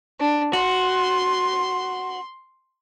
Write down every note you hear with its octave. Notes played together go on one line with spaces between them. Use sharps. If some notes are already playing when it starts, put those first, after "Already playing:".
D4
F#4 C6